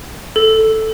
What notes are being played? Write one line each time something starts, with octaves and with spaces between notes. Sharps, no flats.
A4